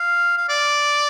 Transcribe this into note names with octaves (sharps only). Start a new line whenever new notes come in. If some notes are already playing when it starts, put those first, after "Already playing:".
Already playing: F5
F5
D5